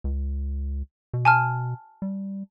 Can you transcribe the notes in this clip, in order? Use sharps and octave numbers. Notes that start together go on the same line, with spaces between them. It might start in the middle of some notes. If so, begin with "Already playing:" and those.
C#2
B2
G#5 A5 F6
G3